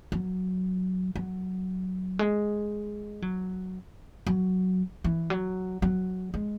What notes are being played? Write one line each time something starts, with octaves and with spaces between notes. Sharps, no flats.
F#3
F#3
G#3
F#3
F#3
E3
F#3
F#3
G#3